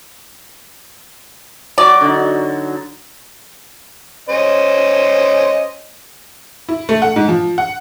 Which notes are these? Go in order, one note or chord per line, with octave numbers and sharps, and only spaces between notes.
F#3 F#4 D5
D3 D#4
C#4 C5 D#5
E4
A3
F#5
G#2
F3
F#5